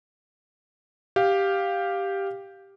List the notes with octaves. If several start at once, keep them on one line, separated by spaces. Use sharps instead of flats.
G4 F5